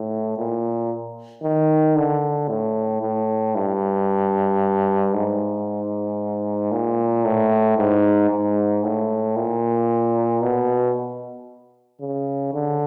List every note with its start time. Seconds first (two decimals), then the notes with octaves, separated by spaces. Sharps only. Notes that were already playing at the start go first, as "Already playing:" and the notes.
Already playing: A2
0.38 A#2
1.43 D#3
1.96 D3
2.48 A2
3.01 A2
3.55 G2
5.14 G#2
6.72 A#2
7.25 A2
7.77 G#2
8.30 G#2
8.84 A2
9.36 A#2
10.42 B2
12.01 C#3
12.53 D3